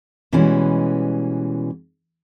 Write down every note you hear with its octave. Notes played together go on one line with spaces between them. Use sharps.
B2 E3 G3 G#3 C#4